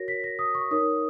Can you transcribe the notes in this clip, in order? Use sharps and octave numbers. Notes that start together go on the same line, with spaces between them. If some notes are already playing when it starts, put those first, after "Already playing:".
Already playing: F#4 A#4 C#5 A#6
B6
A#6
D#6
C#6
D#4 A#4 C#5 D#6